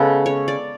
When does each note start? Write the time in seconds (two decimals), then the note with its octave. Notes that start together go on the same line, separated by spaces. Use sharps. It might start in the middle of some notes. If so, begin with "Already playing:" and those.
Already playing: C#3 G#3 B3 A4
0.26 C#5
0.48 D5